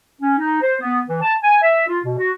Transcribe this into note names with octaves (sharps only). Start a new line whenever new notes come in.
C#4
D#4
C5
B3
E3
A5
G#5
E5
F4
B2
F#4